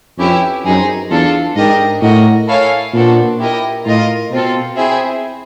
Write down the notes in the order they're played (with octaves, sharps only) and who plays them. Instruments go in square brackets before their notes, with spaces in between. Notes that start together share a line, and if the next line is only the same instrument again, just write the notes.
[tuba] F2 [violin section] C#4 E4 G4 B4 E5
[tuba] F#2 [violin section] C4 D#4 G#4
[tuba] E2 [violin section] D4 F4 A4
[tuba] G#2 [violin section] D4 G4 A#4 D#5
[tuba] A2 [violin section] F#4 A#4 D#5
[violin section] E4 A4 C#5 F5 G#5
[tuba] A#2 [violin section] B3 D4 F#4 A4 C5
[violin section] E4 G4 A#4 D#5
[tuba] A2 [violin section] F4 A#4 D#5
[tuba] B2 [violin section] C4 F4 A4
[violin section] C4 E4 G#4 C5 E5